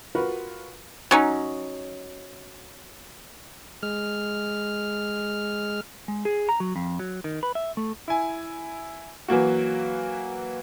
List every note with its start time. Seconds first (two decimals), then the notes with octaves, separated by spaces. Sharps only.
0.15 F4 F#4 A#4 B4
1.11 F#3 C#4 D#4
3.83 G#3 F6
6.08 G#3
6.25 G#4
6.49 A#5
6.60 F#3
6.76 F2
6.99 F#3
7.24 D#3
7.43 B4
7.55 E5
7.77 A3
8.08 E4 G#5
9.28 E3 F#3 A#3 F#4